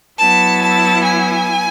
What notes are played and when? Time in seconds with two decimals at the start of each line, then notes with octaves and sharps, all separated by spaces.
0.18 F#3 B3 E4 A5
0.61 A5
1.02 G#5